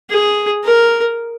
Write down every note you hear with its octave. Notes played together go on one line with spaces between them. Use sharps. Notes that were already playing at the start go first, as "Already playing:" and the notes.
G#4
A#4